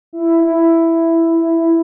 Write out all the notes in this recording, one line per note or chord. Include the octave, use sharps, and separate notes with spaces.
E4
E4